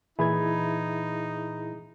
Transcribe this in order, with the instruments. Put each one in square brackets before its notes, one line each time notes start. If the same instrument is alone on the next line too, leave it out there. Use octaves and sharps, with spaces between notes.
[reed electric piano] A#2 B5 G#6 [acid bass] E3 [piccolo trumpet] D#4 [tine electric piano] E4 G#4